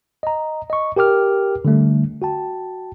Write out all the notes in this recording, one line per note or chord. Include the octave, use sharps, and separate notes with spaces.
D#5 A#5
D#5 C#6
G4 A#4 G5 D6 F6
D3 G3 A3
F#4 G5 A5